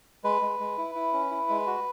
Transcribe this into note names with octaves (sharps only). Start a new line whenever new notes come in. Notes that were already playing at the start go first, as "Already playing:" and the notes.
G#3 B4
G#3
G#3
E4
E4
C#4
E4
G#3
F#4